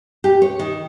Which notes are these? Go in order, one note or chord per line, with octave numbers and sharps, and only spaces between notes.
G4
C#5
D#3